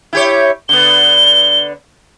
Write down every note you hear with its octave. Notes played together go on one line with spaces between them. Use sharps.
E4 G4 C#5
D3 B3 G7